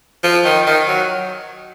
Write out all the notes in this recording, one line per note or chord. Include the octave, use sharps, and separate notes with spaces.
F3
D#3
D#3
F#3